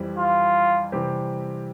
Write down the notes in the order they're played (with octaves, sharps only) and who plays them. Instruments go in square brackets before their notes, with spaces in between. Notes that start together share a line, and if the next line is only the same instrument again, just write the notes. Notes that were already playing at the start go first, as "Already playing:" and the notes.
Already playing: [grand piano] F2 E3 G3 C4 G4
[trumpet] F4
[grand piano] C3 E3 G3 C4 G4